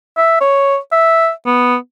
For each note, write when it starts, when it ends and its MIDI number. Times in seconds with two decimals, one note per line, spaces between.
0.17 0.40 76
0.41 0.78 73
0.92 1.30 76
1.46 1.76 59